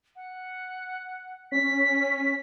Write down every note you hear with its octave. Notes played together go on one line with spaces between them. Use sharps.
F#5
C#4 B6